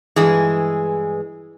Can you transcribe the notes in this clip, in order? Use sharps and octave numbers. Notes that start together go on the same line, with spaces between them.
G2 E3 G#3 G#4